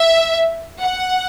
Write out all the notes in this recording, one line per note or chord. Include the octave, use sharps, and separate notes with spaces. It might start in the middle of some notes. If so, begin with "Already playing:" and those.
Already playing: E5
F#5